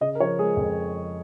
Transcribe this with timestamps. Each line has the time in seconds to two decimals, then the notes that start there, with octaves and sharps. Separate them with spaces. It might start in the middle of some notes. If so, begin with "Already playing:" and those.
0.01 C#3 D#5
0.15 A#4
0.20 F3 C#5
0.39 G#3 G#4
0.57 F2